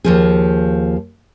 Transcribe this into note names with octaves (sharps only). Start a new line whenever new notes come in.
D#2 F3 G#4